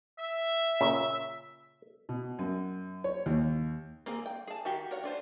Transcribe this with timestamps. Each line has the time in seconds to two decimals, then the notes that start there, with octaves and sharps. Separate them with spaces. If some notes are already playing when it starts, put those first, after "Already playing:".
0.19 E5
0.81 A#2 C#3
2.09 B2
2.39 F#2
3.04 C#5
3.26 D#2
4.06 A#3 C4 G#4
4.26 G5
4.47 G#4 A5
4.65 D#3 F#4 G4
4.91 A#4 C#5 F#5
5.03 D4 F4 C5